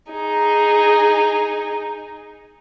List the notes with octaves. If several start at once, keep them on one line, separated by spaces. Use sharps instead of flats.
D#4 G#4